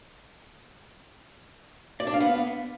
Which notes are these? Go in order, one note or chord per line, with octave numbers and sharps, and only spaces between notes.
D5
D4
F5
B3